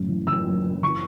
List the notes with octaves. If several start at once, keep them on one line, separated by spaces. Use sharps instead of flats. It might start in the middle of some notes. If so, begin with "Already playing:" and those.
Already playing: F#1 F#2 A2
E3
E3 E6
F#1
F#1
E3 C#6